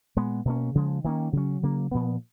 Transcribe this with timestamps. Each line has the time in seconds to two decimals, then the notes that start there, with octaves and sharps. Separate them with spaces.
0.16 A#2 G#3 B3
0.45 B2 A#3 C#4
0.75 C#3 F3 G#3
1.04 D#3 A#3 C#4
1.33 C#3 F#3 C#4
1.63 C#3 F#3 A#3
1.91 A#2 F3 B3